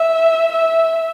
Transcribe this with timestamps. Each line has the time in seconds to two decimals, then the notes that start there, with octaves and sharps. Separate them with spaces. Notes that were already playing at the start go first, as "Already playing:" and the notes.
Already playing: E5
0.52 E5